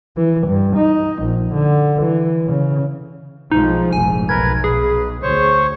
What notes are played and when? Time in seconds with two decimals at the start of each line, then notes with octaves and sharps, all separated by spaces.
0.17 E3
0.47 G2
0.77 D#4
1.23 A#1
1.54 D3
2.03 E3
2.48 C#3
3.52 B1 F3 G#3 D#4
3.93 F1 A#1 G#2 G#5
4.29 B1 A#4 B4 G#6
4.64 G#4 B4
5.22 D2 C5 C#5 C#6